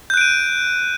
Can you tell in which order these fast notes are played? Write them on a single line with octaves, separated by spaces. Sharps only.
G6 F#6 D7 D#7